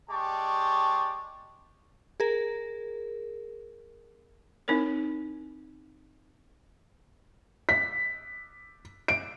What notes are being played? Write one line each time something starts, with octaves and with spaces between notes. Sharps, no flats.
G#3 G4 D5 A5 C#6
G#4 A#4
C4 D#4 E4 A#4 C#5
B6
D7